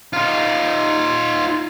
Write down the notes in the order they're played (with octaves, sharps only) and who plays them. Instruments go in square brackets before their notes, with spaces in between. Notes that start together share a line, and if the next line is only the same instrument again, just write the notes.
[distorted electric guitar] D#4 F4